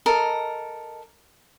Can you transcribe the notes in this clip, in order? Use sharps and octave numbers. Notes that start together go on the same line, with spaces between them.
A4 A#4 D#5